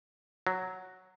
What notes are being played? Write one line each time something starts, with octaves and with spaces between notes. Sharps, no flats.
F#3